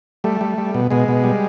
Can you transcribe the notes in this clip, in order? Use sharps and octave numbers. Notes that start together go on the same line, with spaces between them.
G3 A3
G3
G3
B2
B2 G#3
B2
G3